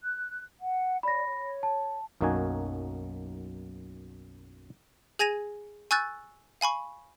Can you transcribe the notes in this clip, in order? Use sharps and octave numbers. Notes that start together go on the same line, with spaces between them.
F#6
F#5
C#5 D5 B5 A#6
C#5
A5
B1 F#2 A#3 D#4 F#4 G#5
G#4 G#5 G#6 A#6 D#7 F7
G#5 C#6 E6 F#6 G6 A6
F5 G#5 B5 C#6